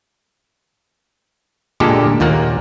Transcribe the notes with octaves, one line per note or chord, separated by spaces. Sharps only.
A#2 D3 G#3 A#3 G4 A4
D#2 A#2 A#3 F#5